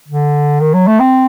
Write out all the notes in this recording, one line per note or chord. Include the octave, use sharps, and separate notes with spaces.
D3
D#3
F#3
A3
C4